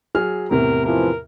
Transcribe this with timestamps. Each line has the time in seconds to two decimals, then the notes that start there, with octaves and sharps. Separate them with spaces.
0.15 F#3 G#4 F6
0.51 E2 A2 C3 A#4
0.85 E3 F3 A#4